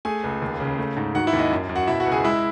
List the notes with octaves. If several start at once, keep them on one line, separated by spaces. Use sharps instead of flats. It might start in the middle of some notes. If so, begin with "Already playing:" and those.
A3 G#4 G#5
C#2
D#2
C#3
A3
G#2
D#3 F#4 F#5
E4 E5
D#2
D#5
F#2
F#2
F#4 F#5
B2 E4 E5
F#4 F#5
C#2
G#4 G#5
G#3 E4 E5